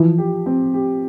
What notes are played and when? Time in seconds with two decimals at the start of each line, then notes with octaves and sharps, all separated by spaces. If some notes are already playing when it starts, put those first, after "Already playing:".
Already playing: E3 F3
0.18 G4
0.46 C4
0.74 G4